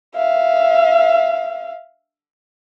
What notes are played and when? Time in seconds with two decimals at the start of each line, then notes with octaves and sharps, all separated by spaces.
0.15 E5 F5